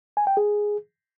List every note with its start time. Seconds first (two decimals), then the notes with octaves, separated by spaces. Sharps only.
0.17 G#5
0.27 G5
0.37 G#4